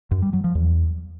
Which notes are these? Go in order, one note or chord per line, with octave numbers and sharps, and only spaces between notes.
F#2
G3
F#3
F3
E2